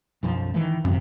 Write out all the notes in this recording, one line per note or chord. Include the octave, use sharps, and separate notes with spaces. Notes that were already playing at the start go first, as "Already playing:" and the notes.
B1 F#2 F3
D#3 E3 A3
G#1 F#2 C3